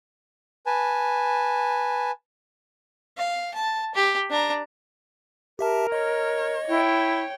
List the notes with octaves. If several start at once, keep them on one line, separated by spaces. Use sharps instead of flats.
B4 G#5 A5
F5
A5
G4
D4 A#5
G4 A#4 E5 A5
C#5 D#5
E4 C#5 G5